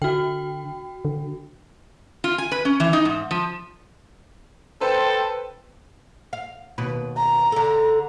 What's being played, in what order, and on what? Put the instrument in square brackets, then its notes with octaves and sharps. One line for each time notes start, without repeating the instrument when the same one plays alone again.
[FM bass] D3 [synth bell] F#4 G5
[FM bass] D3
[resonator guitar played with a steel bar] F4
G#5
B4
C#4
E3
D#4
G#2
F3
[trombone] A4 [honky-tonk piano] B4 C5 A5 [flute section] G5 C6
[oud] F5
D#2 B2 B4
[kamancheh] A#5
[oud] D3 A4